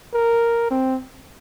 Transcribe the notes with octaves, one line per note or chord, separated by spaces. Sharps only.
A#4
C4